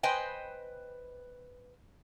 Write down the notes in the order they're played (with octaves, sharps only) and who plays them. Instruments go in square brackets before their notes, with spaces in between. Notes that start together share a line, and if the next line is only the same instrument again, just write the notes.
[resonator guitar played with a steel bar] B4 C5 D#5 G5 G#5